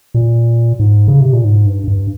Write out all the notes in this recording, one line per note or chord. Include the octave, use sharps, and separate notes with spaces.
A#2
G#2
C#3
C3
A#2
G#2
G2
G2